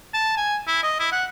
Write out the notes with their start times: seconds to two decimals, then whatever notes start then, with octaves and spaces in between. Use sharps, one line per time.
0.14 A5
0.37 G#5
0.67 E4
0.83 D#5
0.99 E4
1.12 F#5